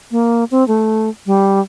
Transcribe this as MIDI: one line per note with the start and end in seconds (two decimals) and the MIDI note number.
0.11 0.44 58
0.51 0.66 60
0.68 1.09 57
1.26 1.60 55